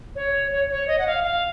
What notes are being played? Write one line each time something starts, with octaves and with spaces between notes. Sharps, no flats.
C#5
C#5
C#5
D#5
F#5
F5
F5